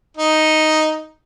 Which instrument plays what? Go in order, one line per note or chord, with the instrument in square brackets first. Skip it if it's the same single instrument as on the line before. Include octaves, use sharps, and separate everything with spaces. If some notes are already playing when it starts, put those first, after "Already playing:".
[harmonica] D#4